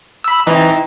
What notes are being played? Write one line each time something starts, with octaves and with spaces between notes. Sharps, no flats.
B5 E6
E3 C4 D#4 E4